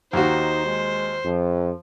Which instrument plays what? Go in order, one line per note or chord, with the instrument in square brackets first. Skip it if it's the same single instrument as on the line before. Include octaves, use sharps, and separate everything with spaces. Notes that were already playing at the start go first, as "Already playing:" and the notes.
[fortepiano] D#2 F#4 [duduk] D#4 [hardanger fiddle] C5
[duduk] G#3
[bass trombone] F2 [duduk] F3